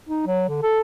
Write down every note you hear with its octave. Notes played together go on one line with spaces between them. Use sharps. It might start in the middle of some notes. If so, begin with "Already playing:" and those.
D#4
F#3
D3
A4